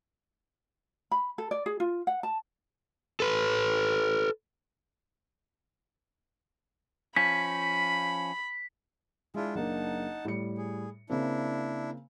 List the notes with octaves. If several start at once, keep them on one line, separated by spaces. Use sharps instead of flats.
B5
A4
D5
G#4
F4
F#5
A5
A4 B4
F3 C#4 B5 B6
G#3 D4 E4 F4
F#1 A#3 D4 D#4 F#5 A5
A2 G3 C#7
G#4
C#3 A#3 C4 D4 E4